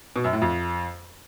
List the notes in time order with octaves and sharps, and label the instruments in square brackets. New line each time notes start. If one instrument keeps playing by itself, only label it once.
[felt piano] B2
F#2
A2
F2